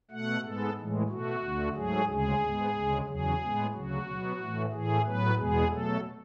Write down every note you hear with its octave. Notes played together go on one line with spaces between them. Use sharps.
B2 A3 F#5
G#2 G#3 B3 A4
A2 E3 G#3
B2 A3 F#4
D2 D3 A3
G#2 F#3 A3 G#4
D2 C#3 G#3 G#4
G#2 G#3 B3
D2 C#3 G#3
E2 C#3 F#3 G#4
A2 G#3 B3
D2 C#3 F#3 F#4
B2 F#3 B3
A2 E3 A3
A2 E3 A3 G#4
A2 F#3 B3 B4
E2 B2 G#3 B3 G#4
B2 F#3 A3 A4